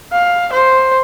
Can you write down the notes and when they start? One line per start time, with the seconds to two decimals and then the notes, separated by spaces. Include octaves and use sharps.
0.12 F5
0.53 C5